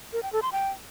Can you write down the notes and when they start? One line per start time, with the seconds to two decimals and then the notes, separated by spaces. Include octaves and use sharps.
0.13 A#4
0.23 G5
0.33 A4
0.42 C6
0.52 G5